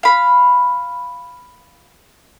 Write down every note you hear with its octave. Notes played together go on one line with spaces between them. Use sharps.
F5 B5